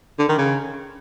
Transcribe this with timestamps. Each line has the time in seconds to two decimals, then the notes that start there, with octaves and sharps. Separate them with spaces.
0.19 D3
0.28 D#3
0.38 C#3